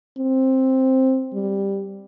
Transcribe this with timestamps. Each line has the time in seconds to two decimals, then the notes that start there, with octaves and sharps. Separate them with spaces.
0.18 C4
1.34 G3